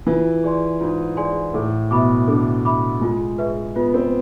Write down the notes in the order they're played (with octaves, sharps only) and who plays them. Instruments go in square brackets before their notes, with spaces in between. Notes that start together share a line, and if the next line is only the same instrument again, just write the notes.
[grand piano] E3 [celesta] F4
[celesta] G#4 D5 G#5 C6
[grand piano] G#2 [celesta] F4
[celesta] G#4 D5 G#5 C6
[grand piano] A2 [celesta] A4
[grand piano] B2 [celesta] E5 B5 D6
[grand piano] D3 [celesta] A4
[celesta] E5 B5 D6
[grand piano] G#3 [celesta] F4
[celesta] G#4 B4 E5
[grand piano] B3 [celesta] F4
[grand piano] C4